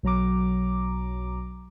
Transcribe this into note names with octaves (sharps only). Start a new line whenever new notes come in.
B1 F#3 A#5 D6